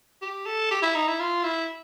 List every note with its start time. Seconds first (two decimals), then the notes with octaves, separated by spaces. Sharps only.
0.22 G4
0.46 A4
0.71 G4
0.82 E4
0.95 D#4
1.08 E4
1.20 F4
1.44 E4